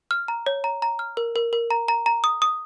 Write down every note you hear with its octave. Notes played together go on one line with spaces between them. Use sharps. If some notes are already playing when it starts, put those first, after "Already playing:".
F6
A#5
C#5
A#5
A#5
F6
A#4
A#4
A#4
A#5
A#5
A#5
D#6
D#6